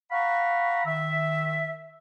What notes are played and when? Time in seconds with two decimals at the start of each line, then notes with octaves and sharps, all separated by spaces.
0.12 F5 F#5 A#5 B5 C#6
0.86 D#3 E5